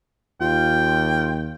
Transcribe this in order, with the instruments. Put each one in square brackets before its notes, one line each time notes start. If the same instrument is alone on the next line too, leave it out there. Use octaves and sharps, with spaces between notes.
[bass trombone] D#2 [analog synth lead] F4 [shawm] G5